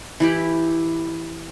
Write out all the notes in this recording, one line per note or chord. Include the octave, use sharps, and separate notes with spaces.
E3 E4 G4